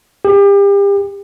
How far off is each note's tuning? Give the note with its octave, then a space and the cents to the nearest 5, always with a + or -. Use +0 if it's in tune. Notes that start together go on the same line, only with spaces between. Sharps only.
G4 +35